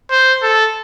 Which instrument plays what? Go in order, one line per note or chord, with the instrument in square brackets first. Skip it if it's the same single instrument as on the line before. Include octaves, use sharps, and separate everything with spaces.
[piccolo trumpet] C5
A4